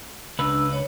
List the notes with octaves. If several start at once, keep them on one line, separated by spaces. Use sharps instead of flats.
C#2 D4 B4 E6
C#5